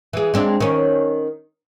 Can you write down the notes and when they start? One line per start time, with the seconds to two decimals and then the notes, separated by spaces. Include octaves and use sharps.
0.13 E3 G#4
0.34 G#3 C4 D4
0.60 D#3 C#4